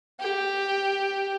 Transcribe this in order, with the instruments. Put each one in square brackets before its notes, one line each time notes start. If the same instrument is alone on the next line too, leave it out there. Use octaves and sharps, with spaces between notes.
[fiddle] G4